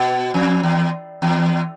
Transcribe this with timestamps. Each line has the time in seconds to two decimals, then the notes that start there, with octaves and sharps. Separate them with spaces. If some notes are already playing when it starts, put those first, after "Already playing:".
Already playing: B2
0.34 F2
0.63 E2
1.22 E2